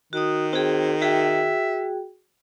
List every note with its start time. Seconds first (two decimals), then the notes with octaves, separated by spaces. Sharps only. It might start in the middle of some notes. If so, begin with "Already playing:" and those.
0.13 D#3 F#4 D#6
0.53 C4 F#4 G#4
1.02 F#4 G#4 E5 G5